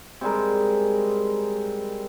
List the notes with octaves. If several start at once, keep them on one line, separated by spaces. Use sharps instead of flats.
C3 G3 G#3 A#4